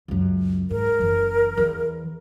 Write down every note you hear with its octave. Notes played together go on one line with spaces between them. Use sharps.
C#2 F#2
G#2 A#4
F#1 E3
E2 E3